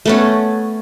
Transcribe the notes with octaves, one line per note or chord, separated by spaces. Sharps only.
A3 B3 C#4